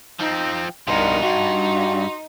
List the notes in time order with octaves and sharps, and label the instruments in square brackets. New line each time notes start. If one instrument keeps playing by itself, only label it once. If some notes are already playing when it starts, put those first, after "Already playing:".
[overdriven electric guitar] F3 C4 [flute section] D#4
[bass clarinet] C2 [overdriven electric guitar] G2 B2 [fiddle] D#4 [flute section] A#4 F#5 C6
[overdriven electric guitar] G2 [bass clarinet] F#4 [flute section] C6